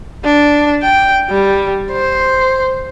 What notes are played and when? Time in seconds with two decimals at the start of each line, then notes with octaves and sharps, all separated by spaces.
0.24 D4
0.83 G5
1.30 G3
1.92 C5